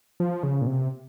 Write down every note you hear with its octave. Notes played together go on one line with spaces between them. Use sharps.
F3
C#3
A#2
C3